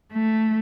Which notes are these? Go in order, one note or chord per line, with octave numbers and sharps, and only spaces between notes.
A3